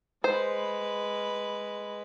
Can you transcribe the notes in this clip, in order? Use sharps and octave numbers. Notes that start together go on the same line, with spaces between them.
G#3 B4 C5